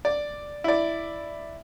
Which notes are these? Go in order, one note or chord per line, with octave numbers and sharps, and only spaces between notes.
D5
E4 D5